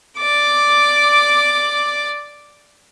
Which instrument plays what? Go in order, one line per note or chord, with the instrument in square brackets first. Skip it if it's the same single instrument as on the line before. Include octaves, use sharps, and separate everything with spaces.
[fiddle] D5 D6